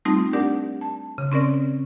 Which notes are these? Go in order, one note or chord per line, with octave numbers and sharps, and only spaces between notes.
G3 A3 C4 D#4 F4
D4 G4 A#4 D5 F#5
A5
C#3
C4 C#4 A#4 D5